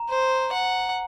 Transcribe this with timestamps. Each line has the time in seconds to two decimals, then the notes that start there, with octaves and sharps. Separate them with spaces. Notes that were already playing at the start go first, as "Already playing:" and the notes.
Already playing: A#5
0.10 C5
0.53 F#5